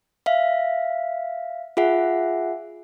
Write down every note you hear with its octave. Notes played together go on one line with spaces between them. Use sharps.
E5 F5
F4 G#4 E5 F#5